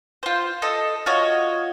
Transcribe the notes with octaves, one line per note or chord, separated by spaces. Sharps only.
F4 C5
A4 D#5
F4 F#4 C#5 D#5